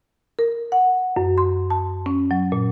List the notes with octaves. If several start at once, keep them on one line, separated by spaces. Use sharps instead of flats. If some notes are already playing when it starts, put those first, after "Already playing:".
A#4
F#5
F#2
C6
A5
C#4
F#3
A#2